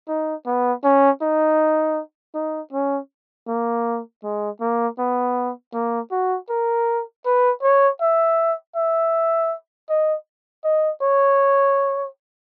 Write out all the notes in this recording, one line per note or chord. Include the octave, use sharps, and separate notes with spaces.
D#4
B3
C#4
D#4
D#4
C#4
A#3
G#3
A#3
B3
A#3
F#4
A#4
B4
C#5
E5
E5
D#5
D#5
C#5